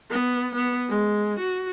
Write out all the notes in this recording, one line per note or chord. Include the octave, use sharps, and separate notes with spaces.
B3
B3
G#3
F#4